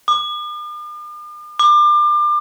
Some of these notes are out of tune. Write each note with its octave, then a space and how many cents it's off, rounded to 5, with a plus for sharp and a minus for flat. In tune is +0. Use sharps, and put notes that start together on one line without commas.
D6 +45
D6 +30